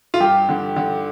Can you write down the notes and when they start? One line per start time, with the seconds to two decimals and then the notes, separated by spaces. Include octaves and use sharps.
0.14 F4
0.20 G2 G4
0.49 D3
0.76 D3